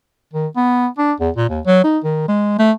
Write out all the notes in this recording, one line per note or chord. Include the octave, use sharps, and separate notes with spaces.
D#3
B3
D4
E2
A#2
D#2
F#3
D#4
D#3
G#3
A3